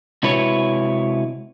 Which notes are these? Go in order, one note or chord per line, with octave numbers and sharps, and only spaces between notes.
C3 G#3 E4 F#4 B4 C#5